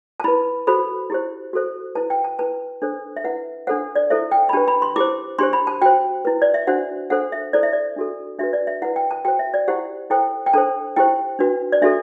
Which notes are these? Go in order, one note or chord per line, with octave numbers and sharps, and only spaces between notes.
A5
E4 B4 B5
F#4 A4 C5 B5
E4 G4 C5
F#4 A4 C5
E4 B4 A5
G5
A5
E4 B4 A5
D4 A4 C5
E5
E4 B4 F#5
D4 A4 C5 F#5
D5
E4 A4 C5 E5
G5
B5
D4 G4 B4 A5
B5
C6
E4 G4 C5 D6
D4 G4 C5 C6
B5
A5
F#4 C5 G5
E4 B4
D5
E5
D4 F#4 C5 F#5
D4 A4 C5 F#5
E5
E4 A4 C5 D5
E5
D5
D4 F#4 A4
D4 F#4 B4 E5
D5
E5
E4 B4 F#5
G5
A5
F#4 C5 G5
E5
D5
E4 G4 C5 F#5
E4 A4 C5 G5
G5
D4 A4 C5 A5
E4 G4 C5 G5
D4 F#4 B4
D5
D4 F#4 A4 E5